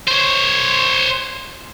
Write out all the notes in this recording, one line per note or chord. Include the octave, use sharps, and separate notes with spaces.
C5 C#5